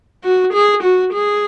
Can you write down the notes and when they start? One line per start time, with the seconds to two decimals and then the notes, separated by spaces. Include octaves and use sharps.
0.24 F#4
0.53 G#4
0.83 F#4
1.13 G#4